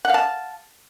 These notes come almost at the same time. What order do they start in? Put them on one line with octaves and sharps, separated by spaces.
F#5 F5 A5